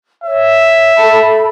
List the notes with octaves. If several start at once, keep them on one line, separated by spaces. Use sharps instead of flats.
C#5 E5
A4 A5 B5